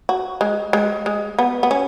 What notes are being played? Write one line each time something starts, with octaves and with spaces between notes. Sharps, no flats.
F#4
G#3
G#3
G#3
B3
B3
C#4